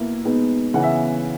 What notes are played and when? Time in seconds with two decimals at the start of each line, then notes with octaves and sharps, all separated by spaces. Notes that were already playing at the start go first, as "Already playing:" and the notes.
Already playing: B2 A#3 E4
0.25 B2 G#3 B3 D#4
0.74 C#3 E3 B3 F#5
0.83 E5